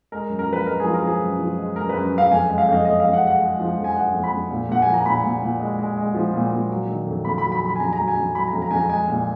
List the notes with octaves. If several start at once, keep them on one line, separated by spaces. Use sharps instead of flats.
G#3 A#4
F#2
A#4
F3 B4
G#3 A#4
G#4
F3
A#4
F3 G#4
F#2
F3
G#3
F#2 A#4
B4
F#2
F#2 F5
F2 G#5
G#3
F5
F2 D#5
F2 D#5
F2 F5
F#5
G#3
F#5
G#3
F3
F2
G#5
G#3 F#5
F2
B5
F2
A#2
A#2 F#5
F3 G#5
A#5
A#2 B5
A#2
A#2
G#3
G#3
G#3
F3
A#2
A#2
F#3
D#3
F2
F2 B5
B5
F#3
B5
F#3 B5
G#5
F2 A#5
A#5
F#3
G#5
F2
F#3 B5
A#5
F2
A#5
F2 G#5
A#5
G#3 G#5
A#2